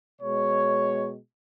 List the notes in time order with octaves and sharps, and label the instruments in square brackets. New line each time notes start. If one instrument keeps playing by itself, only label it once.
[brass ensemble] B2 G#3 C#5